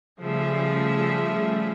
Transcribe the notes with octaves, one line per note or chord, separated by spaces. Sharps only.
C#3 F3 G3 A3 G#4 E5